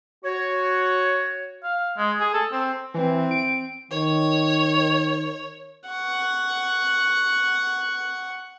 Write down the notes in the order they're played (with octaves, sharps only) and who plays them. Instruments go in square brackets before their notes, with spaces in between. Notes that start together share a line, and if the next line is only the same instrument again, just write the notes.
[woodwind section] F#4 C#5
[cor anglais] F5
G#3
G#4
A4
C4
[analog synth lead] E3 [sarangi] C4
[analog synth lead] D7
[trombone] D#3 [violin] C#5
[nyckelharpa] F#5 C#6